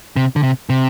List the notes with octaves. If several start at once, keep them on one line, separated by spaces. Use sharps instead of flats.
C3
D3
C3
C3